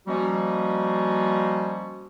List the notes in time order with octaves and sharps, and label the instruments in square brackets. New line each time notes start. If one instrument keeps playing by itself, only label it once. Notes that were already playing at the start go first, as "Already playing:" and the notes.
[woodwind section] F3 G3 A#3 C#4 F#4 D#5